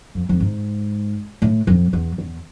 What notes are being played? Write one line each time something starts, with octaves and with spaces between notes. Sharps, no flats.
F2
F2
G#2
A2
F2
E2
E2